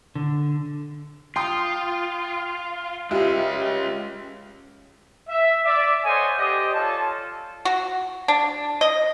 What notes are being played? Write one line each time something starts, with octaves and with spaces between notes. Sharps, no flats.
D3
F4 G5 C6 D#6
G#3 C#4 F4 G4 E5
E5
D5 E5 D6
A4 C5 C#5 D#5 F#5 G#5
G4 C5 D5 D#5
F4 A4 C#5 A5
F#4
D4
D#5